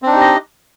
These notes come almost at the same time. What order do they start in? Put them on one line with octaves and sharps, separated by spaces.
C4 D4 D#4 G4 D#5